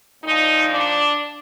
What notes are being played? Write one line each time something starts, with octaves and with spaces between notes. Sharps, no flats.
A#2 F3 D#4
D4